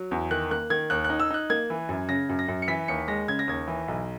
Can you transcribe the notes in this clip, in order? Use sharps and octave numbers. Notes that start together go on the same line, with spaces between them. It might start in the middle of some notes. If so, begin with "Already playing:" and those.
Already playing: F#3
E2
D#3 F#6
A#3 F#6
D#3 G#6
D#2 F#6
F#6
D#4
E6
D#4 F#6
A#3 G#6
E3
F#2
C#3 A#6
F#2
A#6
F#2
C#7
E3 B6
D#2 C#7
G#3 A#6
C#3 G#6
A#6
D#2 G#6
E3
B1